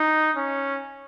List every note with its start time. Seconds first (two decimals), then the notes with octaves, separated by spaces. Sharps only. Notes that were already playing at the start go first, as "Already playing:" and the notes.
Already playing: D#4
0.36 C#4